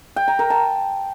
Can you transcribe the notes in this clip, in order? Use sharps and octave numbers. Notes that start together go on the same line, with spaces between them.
G5
A#5
A#4
A5